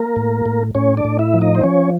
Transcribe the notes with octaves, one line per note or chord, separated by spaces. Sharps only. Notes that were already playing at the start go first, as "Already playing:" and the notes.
Already playing: A#3 A#4
A2
A2
A2 C#4 C#5
D4 D5
A2
E4 E5
F3
D#4 D#5
C5
F3 C#4 C#5